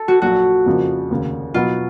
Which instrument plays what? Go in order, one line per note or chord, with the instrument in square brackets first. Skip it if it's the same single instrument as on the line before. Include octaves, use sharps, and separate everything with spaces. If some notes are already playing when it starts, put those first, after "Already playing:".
Already playing: [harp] A4
F#4
[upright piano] A#1 A#2 F#3 [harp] F#4
[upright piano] F2 C#3 F3 A#3
F1 D#2 C#3
[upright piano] B2 F#3 B3 [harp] F4